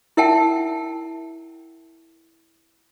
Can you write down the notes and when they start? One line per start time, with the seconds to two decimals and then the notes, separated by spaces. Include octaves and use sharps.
0.17 E4 A#4 E5 F#5 G5 A5